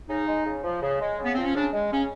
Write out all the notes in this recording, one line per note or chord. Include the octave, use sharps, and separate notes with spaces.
C#3 D#4
G#3
C#3
F3
C#3
G#3
C#3 B3
F3 C4
C#4
C#3 D4
G#3
C#3 C#4